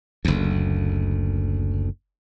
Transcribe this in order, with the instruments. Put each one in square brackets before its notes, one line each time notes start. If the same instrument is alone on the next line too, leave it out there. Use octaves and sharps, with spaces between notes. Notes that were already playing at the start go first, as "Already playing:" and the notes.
[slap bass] F#1 D2